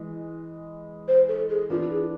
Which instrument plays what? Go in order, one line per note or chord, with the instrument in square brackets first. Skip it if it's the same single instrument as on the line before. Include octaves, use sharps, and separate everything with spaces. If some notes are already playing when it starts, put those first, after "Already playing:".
Already playing: [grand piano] E3 G#3
[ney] C5
A4
G#4
[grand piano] E3 B3 D4 A4 [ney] F4
[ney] G#4